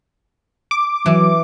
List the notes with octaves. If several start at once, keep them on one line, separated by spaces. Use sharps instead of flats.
D6
E3 F#3